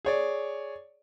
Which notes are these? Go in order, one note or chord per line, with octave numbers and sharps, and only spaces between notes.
G#4 C#5 D5